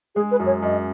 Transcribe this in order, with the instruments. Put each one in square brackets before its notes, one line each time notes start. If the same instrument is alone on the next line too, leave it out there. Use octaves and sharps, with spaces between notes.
[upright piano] G#3 [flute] G#4
[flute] B4
[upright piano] F#2
[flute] C#5
[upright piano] F#2 [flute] D#5